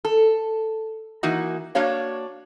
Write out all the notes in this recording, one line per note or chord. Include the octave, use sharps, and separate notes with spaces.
A4
E3 A#3 D#4 F#4
A#3 D4 F#4 C#5 F5